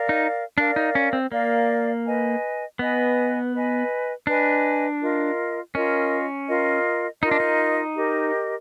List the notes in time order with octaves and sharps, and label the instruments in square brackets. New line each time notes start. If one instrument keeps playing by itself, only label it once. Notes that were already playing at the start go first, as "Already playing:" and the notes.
Already playing: [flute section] A#4 D5 F5
[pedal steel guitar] D#4
[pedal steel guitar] D4 [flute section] A#4 D5 F5
[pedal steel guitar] D#4
C#4
C4
[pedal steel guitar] A#3 [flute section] A#4 D5 F5
[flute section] B4 D#5 G#5
[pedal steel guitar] B3 [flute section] B4 D#5 G#5
[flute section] B4 D#5 G#5
[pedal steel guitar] D4 [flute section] B4 D#5 G#5
[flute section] F4 A#4 D#5
[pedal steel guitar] C#4 [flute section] F4 A#4 D#5
[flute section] F4 A#4 D#5
[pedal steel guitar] D#4 [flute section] F4 A#4 D#5
[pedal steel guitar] D4
D#4
[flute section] G4 A#4 D#5